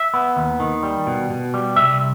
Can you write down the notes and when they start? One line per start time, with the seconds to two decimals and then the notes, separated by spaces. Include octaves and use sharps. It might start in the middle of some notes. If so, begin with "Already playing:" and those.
Already playing: E5
0.14 B3
0.36 D#2
0.60 D#3
0.83 G3
1.07 B2
1.30 B2
1.54 G3
1.76 C2 E5